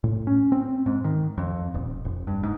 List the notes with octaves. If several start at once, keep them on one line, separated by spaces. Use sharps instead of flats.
A2
C#4
C4
G#2
D#3
F2
D#1
F1
G2
G#2